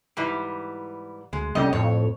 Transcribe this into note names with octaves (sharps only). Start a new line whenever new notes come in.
G#2 E3 G3
D2 G#3
C2 G3 C4 C#4 G4 A4 D#5
F2 A2 C#5